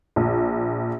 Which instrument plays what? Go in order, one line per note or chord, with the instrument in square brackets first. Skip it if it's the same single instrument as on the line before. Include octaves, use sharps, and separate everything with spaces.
[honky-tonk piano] A#1